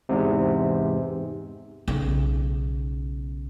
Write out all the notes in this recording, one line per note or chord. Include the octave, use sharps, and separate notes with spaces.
E2 G#2 C3
B1 C#3